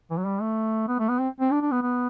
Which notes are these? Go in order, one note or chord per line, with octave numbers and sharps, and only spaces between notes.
E3
F#3
G3
A3
B3
A3
B3
C4
C4
D4
D4
B3
B3